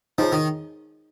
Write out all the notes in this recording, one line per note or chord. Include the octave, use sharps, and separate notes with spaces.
F3 D#4 G#4 C#5
D#3